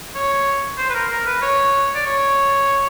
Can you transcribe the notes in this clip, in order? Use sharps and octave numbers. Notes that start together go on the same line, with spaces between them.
C#5
C5
B4
A#4
A#4
B4
C#5
D5
C#5